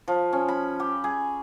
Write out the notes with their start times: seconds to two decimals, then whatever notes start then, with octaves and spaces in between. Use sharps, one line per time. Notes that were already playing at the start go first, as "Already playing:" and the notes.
0.08 F3
0.33 C#4
0.48 B5
0.80 G4
1.04 G#4